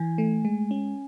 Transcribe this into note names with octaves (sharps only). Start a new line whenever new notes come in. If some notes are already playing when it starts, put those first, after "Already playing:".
Already playing: E3 G#5
A3
G#3
C#4